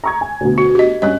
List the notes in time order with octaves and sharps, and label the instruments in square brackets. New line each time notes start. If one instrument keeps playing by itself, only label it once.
[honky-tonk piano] A#5 C#6 G#6
G#5
D2 B2
[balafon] F#4
G4 D#5
[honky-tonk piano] G2 C#4 F#6 [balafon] D#5